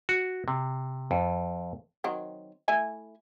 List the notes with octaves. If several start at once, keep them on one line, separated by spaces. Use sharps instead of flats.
F#4
C3
F2
D#3 F#3 C4
A3 E4 G#5